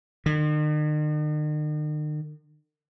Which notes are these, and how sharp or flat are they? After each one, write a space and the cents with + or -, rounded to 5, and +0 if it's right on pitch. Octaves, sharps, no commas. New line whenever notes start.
D#3 -45